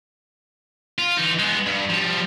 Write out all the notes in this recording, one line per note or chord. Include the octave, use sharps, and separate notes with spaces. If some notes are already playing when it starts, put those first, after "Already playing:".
F4
E3 D#4
G#3 B3
G2
F3 G3